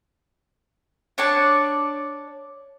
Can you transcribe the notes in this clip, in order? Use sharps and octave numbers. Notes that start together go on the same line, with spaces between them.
D4 C#5 D5 A5